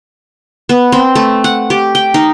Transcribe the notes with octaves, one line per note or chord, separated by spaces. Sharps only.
B3
C4
A3
F#5
G4
G5
D#4